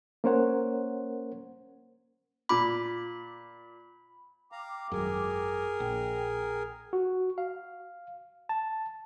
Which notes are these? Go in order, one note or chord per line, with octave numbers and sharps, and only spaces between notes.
A#3 C#4 A#4 C5 C#5 F#5
A#2 B5 D6
F5 G5 A#5 D6
G#1 F#2 G#4 A#4
A#1 G5
F#4
F5
A5